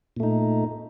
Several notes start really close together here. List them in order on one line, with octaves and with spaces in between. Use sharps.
A#2 A3 D#4